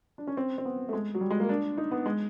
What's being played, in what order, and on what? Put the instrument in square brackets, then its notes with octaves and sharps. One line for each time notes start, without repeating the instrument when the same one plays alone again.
[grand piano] D4
C#4
C4
C4
B3
A3
G#3
F#3
G3
G#3
A#3
D4
D#4
B3
G#3